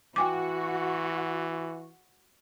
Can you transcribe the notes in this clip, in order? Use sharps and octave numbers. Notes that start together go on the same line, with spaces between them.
E3 F#4 G5 G#5 D6